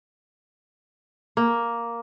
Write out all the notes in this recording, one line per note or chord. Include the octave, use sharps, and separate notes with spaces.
A#3